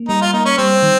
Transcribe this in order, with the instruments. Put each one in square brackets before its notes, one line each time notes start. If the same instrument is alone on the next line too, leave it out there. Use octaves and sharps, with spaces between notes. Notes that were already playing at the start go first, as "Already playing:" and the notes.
Already playing: [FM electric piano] A#3
[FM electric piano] G3 [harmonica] D#4
[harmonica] F4
[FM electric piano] A#3 [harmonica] D#4
[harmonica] C#4
[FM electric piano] G3 [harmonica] C4
[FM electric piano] D#3